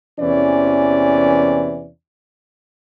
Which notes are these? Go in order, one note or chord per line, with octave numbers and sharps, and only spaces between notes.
E2 C3 E3 C#4 D5